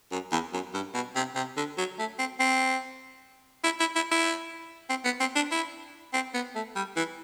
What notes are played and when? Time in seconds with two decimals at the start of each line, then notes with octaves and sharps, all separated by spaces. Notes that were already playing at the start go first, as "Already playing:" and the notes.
0.12 F#2
0.32 E2
0.53 F#2
0.74 G2
0.94 B2
1.16 C3
1.36 C3
1.57 D3
1.78 F#3
1.99 A3
2.19 C4
2.40 C4
3.64 E4
3.80 E4
3.96 E4
4.12 E4
4.90 C4
5.05 B3
5.20 C4
5.36 D4
5.52 E4
6.13 C4
6.34 B3
6.55 A3
6.76 G3
6.97 E3